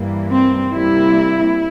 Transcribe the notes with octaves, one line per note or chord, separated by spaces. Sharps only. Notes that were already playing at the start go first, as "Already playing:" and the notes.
Already playing: G2 E3 G3 A#3
C4
C3 G3 A#3 E4